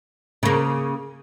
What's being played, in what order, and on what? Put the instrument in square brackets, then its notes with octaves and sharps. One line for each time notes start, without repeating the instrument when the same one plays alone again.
[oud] C#3 A#3